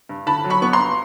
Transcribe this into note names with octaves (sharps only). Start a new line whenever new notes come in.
G2
D3 A5 B5
F#3
B5 C#6
B3 C#6
A#5 C6
G2